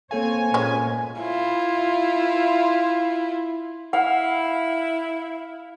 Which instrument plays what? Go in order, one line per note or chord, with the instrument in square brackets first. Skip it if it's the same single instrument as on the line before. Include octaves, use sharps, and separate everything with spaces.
[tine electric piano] A#3 A4 F5 [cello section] C4 C#5 [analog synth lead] G#5
[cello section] A#2 [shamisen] F3 G#3 C#4
[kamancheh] E4 F4
[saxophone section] E4 [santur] F5 [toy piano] F#5